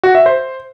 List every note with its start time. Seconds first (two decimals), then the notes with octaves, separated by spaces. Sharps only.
0.03 F#4
0.15 E5
0.26 C5